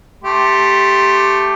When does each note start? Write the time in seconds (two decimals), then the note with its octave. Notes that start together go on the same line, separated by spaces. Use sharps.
0.24 A3 G4 C6